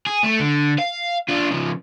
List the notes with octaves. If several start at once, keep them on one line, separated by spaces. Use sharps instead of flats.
G#4
A3
D3
F5
D4 F4
C#3 F3